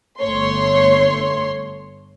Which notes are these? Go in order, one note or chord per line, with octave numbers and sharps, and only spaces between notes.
G1 A3 C#5 C6